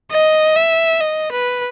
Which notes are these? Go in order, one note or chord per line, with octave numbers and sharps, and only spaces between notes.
D#5
E5
D#5
B4